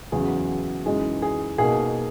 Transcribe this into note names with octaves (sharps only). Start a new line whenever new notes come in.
E2 C#3 F#3 G#4
F#2 E3 G#3 D#4 G#4
G#4
B2 A#3 D#4 G#4